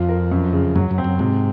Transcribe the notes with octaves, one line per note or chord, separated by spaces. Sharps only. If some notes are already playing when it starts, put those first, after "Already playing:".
Already playing: F2 F4
A#4
F#2
C#3
F#2 F#3
F#2
C4
F#2
G#2 C3